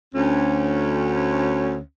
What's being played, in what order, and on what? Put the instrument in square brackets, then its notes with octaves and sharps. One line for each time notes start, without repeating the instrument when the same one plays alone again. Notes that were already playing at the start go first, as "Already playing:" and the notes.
[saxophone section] D2 C#4